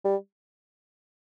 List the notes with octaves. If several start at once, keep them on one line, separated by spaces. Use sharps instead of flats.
G3